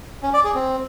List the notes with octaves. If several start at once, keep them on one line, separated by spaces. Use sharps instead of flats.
C#4
D5
G#4
C4